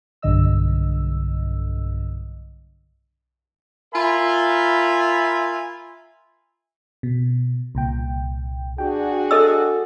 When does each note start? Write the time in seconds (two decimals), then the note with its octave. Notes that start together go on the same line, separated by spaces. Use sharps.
0.22 B1 G2 D3 D#5 E6
3.94 F4 A#4 E5 G#5 B5
7.03 B2
7.75 C2 A#2 G5
8.78 D4 F#4 G#4 G5
9.31 A4 D#5 E6